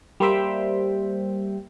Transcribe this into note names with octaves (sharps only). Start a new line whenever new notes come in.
G3 A#3 C5 E5 G5